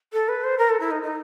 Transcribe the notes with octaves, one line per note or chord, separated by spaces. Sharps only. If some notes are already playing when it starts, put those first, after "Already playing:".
A4
B4
C5
A#4
A4
E4
D#4
D#4